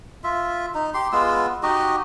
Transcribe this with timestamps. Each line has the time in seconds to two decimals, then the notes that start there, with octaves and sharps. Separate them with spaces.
0.24 F4 E5
0.74 D#4
0.94 G4 C6
1.12 G#3 B3 F4 E6
1.63 D#4 F#4 G4 D#5